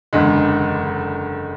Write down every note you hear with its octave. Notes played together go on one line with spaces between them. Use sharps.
F#1 E2 D3 G#3